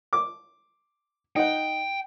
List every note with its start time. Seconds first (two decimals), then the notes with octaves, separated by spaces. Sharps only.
0.13 D6
1.36 D#4 F#5 G5